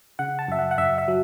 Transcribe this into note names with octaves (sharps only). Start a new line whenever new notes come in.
C#3 F#5
A5
F#2 E5
F#5
F#5
F#2 E5
E5
F#3